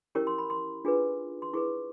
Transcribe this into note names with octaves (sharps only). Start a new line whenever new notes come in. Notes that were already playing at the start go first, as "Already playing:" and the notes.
C#4 E4 G4 A#4 C#5 C#6
C6
B5
C6
D4 F4 G#4 B4
C6
E4 G#4 B4 C#6